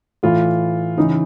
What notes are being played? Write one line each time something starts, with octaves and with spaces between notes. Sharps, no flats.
A2 E3 F4
C#3 E3 D#4